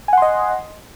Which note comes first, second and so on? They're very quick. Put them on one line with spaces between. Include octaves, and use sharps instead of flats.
G#5 F#5 C6 D#5